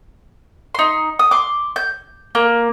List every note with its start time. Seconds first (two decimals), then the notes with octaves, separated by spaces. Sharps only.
0.75 D#4 C6
1.19 D#6
1.31 C6 D6
1.76 G6
2.35 A#3